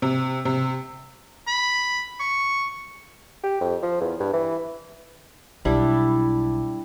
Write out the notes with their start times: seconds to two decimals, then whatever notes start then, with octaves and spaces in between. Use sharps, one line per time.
0.02 C3
0.45 C3
1.47 B5
2.20 C#6
3.44 G4
3.61 F2
3.83 F3
4.01 E2
4.20 G2
4.33 E3
5.65 B1 G3 D4 E4